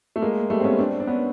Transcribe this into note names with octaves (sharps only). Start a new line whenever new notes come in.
A3
G#3 A#3
G3 A3
C4
B3 C#4
C4 D4
D4
B3 C#4